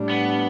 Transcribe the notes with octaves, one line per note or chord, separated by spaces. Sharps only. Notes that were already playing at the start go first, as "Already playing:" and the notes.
Already playing: A2 G3 D4
B3